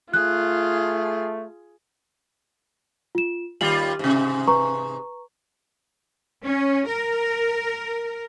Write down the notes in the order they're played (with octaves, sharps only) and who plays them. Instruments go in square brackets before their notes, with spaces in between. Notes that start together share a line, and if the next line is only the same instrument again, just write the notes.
[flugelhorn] A3 [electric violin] F4 [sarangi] G#4 [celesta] F#6
[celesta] F4 E7
[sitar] D#2 G3 F4 [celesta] F#7
[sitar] G#2 C3
[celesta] B4 A#5 C#6
[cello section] C#4
A#4